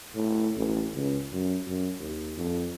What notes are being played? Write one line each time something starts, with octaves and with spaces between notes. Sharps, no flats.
A2
A1
C#2
F#2
F#2
D#2
F2